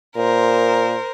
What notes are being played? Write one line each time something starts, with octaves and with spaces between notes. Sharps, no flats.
A#2 A#4 C5